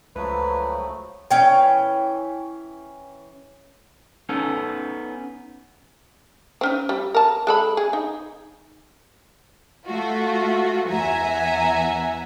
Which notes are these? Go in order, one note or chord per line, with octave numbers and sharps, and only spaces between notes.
C#2 F3 F#3 A3 B4
E3 C#4 G5
B3 C#4 D#4 A4
C4 C#4 D#4
G3
A#4 A5
G#3 A4 B5
G#4
D#4
A3 F4 F#4
E2 E5 F#5 G#5 A#5